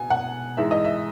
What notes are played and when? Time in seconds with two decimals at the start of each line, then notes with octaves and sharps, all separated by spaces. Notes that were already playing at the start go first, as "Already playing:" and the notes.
Already playing: B2 G#5
0.10 F#5
0.57 G#2 E3 G#3 E5
0.71 D#5
0.85 E5